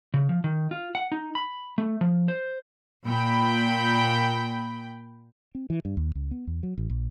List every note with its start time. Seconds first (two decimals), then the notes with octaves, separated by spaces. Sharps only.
0.14 C#3
0.29 F3
0.44 D#3
0.71 F4
0.95 F#5
1.12 D#4
1.35 B5
1.78 A3
2.01 F3
2.28 C5
3.06 A#2 G5 B5
5.55 C4
5.70 E3
5.85 G2
5.97 D#2
6.15 C#2
6.31 B3
6.47 E2
6.63 F#3
6.78 A1
6.90 A#1